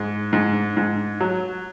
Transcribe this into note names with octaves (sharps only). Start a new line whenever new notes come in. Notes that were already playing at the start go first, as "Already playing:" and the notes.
Already playing: G#2
G#2
G#2
F#3